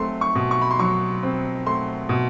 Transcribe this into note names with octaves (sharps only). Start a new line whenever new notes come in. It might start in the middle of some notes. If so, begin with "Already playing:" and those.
Already playing: F#3 A3 C4 C6
C#6
B2
C#6
B5
C6
F#3 C#6
C4
A3 C6
B2